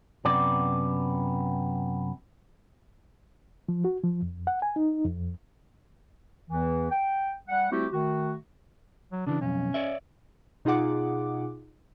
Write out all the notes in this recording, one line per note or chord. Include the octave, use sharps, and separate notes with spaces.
F#2 C3 B3 D5
F3
F#4
F3
F2
F#5
G#5
D#4
F2
E2 E3
G5
G3 F#5
G3 A3 C4 E4 F#4 G4
D#3 A3 F#4
F#3
C#3 E3 D4
B1 F2 C#4
C#5 D5 E5
B2 D#4 F4 G#4 F#5 D6